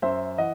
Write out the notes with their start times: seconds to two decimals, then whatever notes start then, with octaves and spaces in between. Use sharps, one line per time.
0.02 F#2 C5 E5
0.38 E3 D#5 F#5